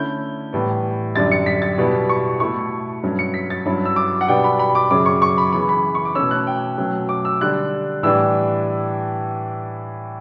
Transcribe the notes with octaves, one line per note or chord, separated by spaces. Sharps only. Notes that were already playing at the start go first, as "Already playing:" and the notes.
Already playing: D3 A3 C#4 E4 G6
A2 E3 G3 B3
F#2 D3 G3 D4 A6
C#7
B6
A6
B2 G3 B3 E4
C#6
B2 A3 E4 C#6
G2 F#3 C#4
C#7
B6
A6
G2 F#3 C#4 E4
E6
D6
F#5
B2 G3 B3 D4 G5
B5
B5
D6
F#2 C#3 F#3 D6
C#6
C#6
B5
C#3 E3 B3 B5
B5
C#6
D6
B2 A3 C#4 E6
F#6
G5
B2 F#3 A3 C#4
D6
E6
D3 G3 D4 F#6
A2 E3 G3 D4 E6